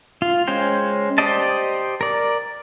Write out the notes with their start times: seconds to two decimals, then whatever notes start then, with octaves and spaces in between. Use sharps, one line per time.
0.22 F4
0.48 G#3 C#4 C5 G5
1.18 G4 C5 D5 D#5 A5
2.01 A#4 D5